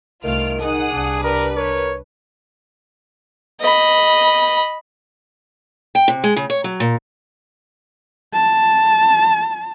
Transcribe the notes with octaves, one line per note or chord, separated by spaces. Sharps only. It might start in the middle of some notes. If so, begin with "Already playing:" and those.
C2 D#3 A3 F4 F6 D7
D#4 G#4 F#5 D#6
C2 D4
G3 A#4 B4
A#4 C#5
D#5 B5
G5
C3
G#3
C#3
C#5
F#3
A#2
A5